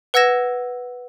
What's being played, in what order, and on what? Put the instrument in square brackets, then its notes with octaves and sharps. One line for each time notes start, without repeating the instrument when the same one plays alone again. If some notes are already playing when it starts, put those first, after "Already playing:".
[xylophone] B4 F#5 E6 G#6 A#6 E7